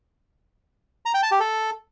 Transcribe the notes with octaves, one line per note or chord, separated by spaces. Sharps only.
A#5
G5
A5
G4
A4